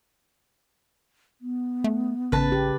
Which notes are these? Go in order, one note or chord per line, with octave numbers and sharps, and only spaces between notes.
B3
A3
A1 C#3 B4 A5
G4